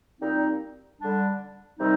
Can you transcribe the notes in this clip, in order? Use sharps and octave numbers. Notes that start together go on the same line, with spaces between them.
A#2 G3 C4 D#4
D3 G3 D4
C3 D#3 G3 C4 D#4